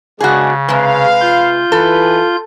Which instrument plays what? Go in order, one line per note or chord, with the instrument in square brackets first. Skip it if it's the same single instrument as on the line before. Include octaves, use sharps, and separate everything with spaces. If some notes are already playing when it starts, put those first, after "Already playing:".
[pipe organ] C#3 [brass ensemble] G#3 B3 D4 [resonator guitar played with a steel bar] F#4 G#4
[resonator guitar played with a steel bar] C3 G#3 [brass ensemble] B4 F5
[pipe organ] F4 G6
[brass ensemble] E3 B4 [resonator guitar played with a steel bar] A4